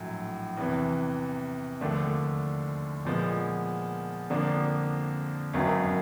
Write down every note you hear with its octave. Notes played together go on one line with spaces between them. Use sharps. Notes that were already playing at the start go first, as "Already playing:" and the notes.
Already playing: A#1 A2 F#3
E2 C3 E3
D#2 D3 F3 A3 D4
A#2 F3 G#3 B3
F2 D3 F3 A#3 D4
G#1 F#2 D#3 F#3 B3